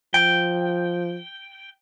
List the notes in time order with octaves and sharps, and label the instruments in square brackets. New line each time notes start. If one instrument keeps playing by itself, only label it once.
[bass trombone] F3 [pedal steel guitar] G5